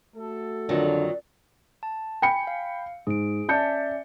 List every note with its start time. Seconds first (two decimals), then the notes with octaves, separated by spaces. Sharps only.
0.16 A3 F#4 A4
0.69 F2 D3 D#3 F#3 D5
1.83 A5
2.22 G5 G#5 B5 C#7
2.47 F5
3.07 G#2 G#4 D7
3.49 C#4 D5 E5 A5 G6 C#7